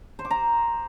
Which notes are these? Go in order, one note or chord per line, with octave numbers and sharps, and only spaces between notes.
C5
D6
A#5